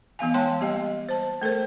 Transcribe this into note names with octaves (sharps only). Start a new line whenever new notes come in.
E3 B3 F5 G#5
G#3 C#5 G5 A5 C6
G3 A#3 G4 D#5
C5 A5
A3 A4 A#4 C5